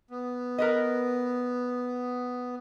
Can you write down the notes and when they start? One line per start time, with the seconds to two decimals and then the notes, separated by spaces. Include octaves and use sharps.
0.11 B3
0.58 A#4 B4 D#5